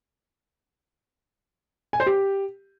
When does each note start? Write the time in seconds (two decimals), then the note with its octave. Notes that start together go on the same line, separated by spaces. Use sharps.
1.93 G#5
2.00 C5
2.06 G4